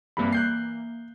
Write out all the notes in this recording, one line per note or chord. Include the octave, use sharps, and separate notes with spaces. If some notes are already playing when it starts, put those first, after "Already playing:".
G2 C3 E3 A#3 B5
F#6 G6 C7